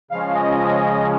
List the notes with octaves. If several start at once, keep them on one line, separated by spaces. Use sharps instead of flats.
C#3 F3 G#3 C#4 F5
D#5